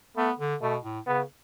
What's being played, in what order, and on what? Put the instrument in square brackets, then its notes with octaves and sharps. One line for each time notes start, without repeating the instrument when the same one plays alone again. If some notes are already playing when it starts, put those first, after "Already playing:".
[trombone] A3 [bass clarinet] B3
[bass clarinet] D3
[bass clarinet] B2 [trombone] A3
[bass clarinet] A2
[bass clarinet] C#3 [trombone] B3